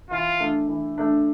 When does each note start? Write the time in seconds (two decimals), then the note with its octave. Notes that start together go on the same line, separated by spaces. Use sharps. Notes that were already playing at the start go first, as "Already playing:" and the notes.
0.10 E3 F4
0.40 A3 D4
0.68 E3
0.98 A3 D4